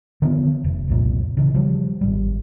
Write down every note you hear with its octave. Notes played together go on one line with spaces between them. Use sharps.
D3 D#3 F3 B3
F1
C2 F2 A#2
C#3 E3
F3 G3
G#1 G3